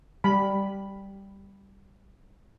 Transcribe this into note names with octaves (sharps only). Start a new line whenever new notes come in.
G3 B5